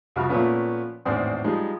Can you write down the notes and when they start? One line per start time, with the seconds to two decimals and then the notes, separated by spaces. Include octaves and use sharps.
0.16 C2 F2 F#4 B5 F6
0.29 A#2 F3 A3 B3 C#4
1.05 G#1 E2 A2 C4 D4 C6
1.44 F3 G3 G#3 D#4